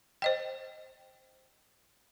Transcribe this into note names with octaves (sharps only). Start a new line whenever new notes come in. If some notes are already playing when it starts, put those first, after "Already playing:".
C5 D#5 G5